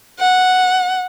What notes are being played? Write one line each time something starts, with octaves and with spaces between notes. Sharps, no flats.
F#5